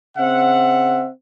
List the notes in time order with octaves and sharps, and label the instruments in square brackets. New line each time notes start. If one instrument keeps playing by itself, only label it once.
[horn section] C#3 C4 E5 F#5